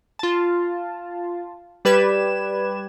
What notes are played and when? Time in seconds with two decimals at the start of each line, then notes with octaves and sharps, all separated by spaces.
0.19 F4 A5
1.85 G3 G4 B4 D5 G#6 E7